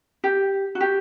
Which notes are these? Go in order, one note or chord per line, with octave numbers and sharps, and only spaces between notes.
G4
F#4
G4